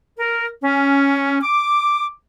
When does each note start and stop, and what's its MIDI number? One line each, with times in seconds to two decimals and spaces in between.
0.19 0.47 70
0.64 1.40 61
1.42 2.08 86